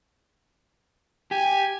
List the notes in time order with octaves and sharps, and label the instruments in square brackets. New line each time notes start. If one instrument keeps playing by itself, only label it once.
[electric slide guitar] G4 [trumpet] G#5